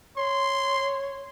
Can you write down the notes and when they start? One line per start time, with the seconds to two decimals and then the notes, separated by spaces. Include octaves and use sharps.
0.17 C#5 C6